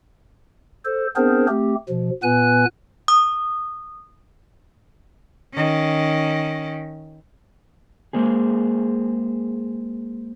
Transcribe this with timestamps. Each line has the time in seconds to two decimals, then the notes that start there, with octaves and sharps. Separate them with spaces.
0.85 A4 C5
1.16 B3 C4 D4 G#4 A#4 C5
1.48 A3 C4 G4
1.89 B2 F3
2.23 A#2 B3 B4 G#5 F#6
3.08 D#6
5.54 D#3 C#4
8.13 G#3 A#3 C4 G#4